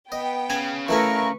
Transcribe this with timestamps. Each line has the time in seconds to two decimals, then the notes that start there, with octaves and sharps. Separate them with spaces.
0.12 B3 D#5 G5
0.50 C#3 G#5
0.88 E3 A3 E4 A#4 B4 F5 A#5 C#6